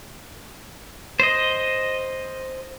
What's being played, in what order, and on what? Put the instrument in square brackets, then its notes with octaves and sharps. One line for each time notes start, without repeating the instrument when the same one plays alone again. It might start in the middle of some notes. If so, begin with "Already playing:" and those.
[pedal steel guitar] C5 D#5